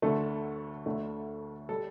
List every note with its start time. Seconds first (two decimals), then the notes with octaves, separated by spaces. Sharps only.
0.02 D2 D3 A3 A4
0.86 D2 D3 A3
1.69 G3 A4